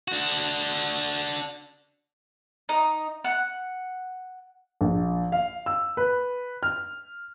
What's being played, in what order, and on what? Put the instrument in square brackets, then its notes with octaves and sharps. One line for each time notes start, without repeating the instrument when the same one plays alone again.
[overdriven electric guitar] D4 F#4
[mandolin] D#4
F#5
[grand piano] A#1
F5
E6
B4
F6